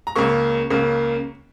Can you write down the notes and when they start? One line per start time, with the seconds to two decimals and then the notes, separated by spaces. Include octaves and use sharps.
0.07 A#5
0.16 C#2 C#3 A#3 C#6
0.70 C#2 C#3 A#3